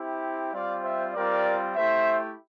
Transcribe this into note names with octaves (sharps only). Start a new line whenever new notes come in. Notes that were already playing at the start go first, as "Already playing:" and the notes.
Already playing: C4 E4 G4
G3 C4 F4 D5 F5
C5 E5
G3 C4 F4 A#4 D5
A3 E4 G4 C5 E5